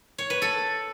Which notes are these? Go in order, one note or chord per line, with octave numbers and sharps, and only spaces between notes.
C#5
B4
A4